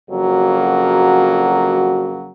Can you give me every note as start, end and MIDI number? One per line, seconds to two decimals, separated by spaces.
0.10 2.32 41
0.10 2.32 49
0.10 2.32 54
0.10 2.32 58
0.10 2.32 66